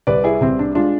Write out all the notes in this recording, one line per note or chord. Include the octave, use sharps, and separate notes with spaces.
C2 B4 D5
E4 G#4
C2 C4
D4
G#3 D4 F4